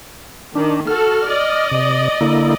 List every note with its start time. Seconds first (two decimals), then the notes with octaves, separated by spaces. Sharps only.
0.55 D#3 D4
0.87 F#4 A4 F6
1.29 D5 D#5
1.71 C3
2.21 D3 A#3 E4